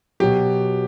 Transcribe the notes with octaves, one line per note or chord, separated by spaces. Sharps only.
B2 F#3 G4